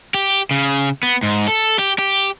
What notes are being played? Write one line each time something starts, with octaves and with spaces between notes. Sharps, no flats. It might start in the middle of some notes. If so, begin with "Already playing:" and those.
G4
C#3
B3
G#2
A4
G4
G4